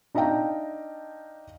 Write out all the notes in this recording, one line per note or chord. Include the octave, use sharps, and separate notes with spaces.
D4 D#4 E5 F5 G5 A#5